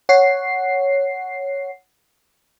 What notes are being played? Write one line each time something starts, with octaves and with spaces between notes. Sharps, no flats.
C#5 F#5 C7